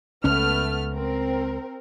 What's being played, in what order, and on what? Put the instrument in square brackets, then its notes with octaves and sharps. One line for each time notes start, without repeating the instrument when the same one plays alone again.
[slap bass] C#2 C#4 [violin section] A3 B3 F6
[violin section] C4 A#4